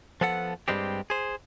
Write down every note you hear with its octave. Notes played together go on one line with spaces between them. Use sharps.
F3 B3 A4 F#5
G2 G3 G#3 C4 G4
G#4 C5